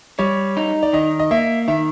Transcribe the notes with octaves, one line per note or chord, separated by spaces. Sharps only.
G3 C#5
D#4
D5
D#3 D#5
D#5
A#3 E5
D#3 E5